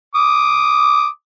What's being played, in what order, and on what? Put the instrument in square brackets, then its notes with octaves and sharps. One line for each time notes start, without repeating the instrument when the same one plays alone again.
[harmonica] D6 D#6